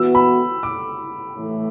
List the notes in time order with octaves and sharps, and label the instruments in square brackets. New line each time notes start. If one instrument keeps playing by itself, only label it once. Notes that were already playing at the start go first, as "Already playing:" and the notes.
Already playing: [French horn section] E3 B3 F#4 [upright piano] E6
[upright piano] B5
D6
[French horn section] A2 E3 A3